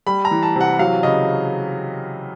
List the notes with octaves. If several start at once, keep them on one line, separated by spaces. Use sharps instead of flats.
G3 B5
A#5
E3
A5
C3 F#5
F#3 F5
C#3 D#5